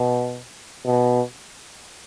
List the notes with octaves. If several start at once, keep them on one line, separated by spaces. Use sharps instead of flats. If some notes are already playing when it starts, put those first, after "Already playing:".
Already playing: B2
B2